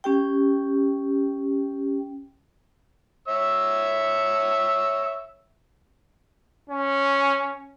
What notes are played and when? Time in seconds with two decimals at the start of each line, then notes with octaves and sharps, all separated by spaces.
0.04 C#4 G4 G5
3.28 C#5 E5 E6
6.69 C#4